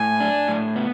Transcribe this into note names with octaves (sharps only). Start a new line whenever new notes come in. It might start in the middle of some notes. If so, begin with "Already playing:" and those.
Already playing: A2 G#5
D4
A2
B3